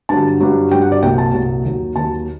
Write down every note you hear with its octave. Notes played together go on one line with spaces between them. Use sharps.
G2 D3 F#3 A5
G2 F#3
G2 F#3 G5
F#5
D5
C2 A#2 F#3 G5
A5
C2 A#2 F#3
D#2 D#3 F#3
D#2 D#3 F#3 A5